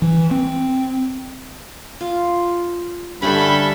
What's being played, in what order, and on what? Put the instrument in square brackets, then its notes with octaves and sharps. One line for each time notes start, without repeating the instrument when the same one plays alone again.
[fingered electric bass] E3
C4
[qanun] F4
[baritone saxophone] G2 [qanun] D3 C#4 [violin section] A4 E5 [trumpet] B5